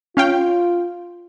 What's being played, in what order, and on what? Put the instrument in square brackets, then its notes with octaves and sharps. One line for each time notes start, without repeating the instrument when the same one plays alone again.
[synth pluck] C#4 F5 G5 [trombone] F4